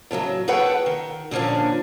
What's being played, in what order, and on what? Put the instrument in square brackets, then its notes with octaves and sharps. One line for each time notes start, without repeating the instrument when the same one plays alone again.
[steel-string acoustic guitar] A2 C#3 E3 F#3
G#4 A4 B4 C#5 F#5 G5
D#3
A#2 D3 F3 C#4 D4